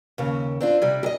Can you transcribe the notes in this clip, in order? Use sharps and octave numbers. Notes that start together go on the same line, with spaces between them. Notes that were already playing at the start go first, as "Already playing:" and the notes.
D#2 C#3
C4 D4 F4
C3 G3
G4 D#5